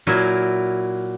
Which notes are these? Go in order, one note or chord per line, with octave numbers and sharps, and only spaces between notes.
A#2 F#3 E4 F#4 A#4 G#5